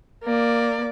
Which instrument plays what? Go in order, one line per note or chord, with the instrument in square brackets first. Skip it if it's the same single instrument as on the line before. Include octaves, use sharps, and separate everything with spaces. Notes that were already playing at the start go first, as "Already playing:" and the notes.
[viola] A#3 D5